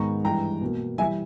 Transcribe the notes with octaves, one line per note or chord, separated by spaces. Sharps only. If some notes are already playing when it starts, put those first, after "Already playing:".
Already playing: G#2 D#3 G#3 B3 A#5 C#6
G2 E3 G#3 G5 A#5
B2 A#3
E3 G3 E5 G#5